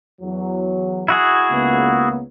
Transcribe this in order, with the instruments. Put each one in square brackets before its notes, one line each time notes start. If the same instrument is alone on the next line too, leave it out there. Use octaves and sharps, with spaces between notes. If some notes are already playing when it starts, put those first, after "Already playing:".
[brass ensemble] E2 F#3
[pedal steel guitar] E4 F#4 G#4
[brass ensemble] C#2 A#3 B3